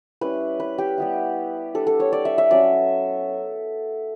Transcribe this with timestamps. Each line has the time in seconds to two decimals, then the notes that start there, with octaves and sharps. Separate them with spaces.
0.21 G3 C#4 E4 B4
0.60 B4
0.78 G4
0.98 G3 B3 E4
1.75 G3 D4 A4
1.87 A4
2.00 C#5
2.13 D5
2.25 E5
2.38 E5
2.51 F#3 C#4 D5